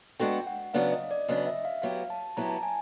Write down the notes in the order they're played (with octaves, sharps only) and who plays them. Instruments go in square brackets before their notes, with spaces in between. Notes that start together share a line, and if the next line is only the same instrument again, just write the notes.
[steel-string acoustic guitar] G#3 B3 D4 F#4 A4 [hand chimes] G5
[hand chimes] F#5
[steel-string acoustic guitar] C#3 F#3 B3 D4 [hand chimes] F5
[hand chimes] D#5
D5
[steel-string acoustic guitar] C#3 F#3 B3 D4 [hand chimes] D#5
[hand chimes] E5
F5
[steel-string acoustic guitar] F#3 B3 E4 G4 [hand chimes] F5
[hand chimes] A5
[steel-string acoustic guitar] F#3 B3 E4 G4 [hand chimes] A#5
[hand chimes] A5
G#5